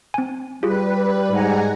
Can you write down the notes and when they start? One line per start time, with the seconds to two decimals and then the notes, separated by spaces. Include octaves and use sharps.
0.14 C4 G#5
0.63 G3 F4 G4 G#4 B4
1.31 G#2 F#5 G#5 A#5